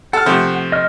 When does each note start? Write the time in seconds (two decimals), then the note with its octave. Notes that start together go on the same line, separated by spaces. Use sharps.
0.13 A4 F#5 F6
0.26 C3 F3 A3
0.72 D#5 F6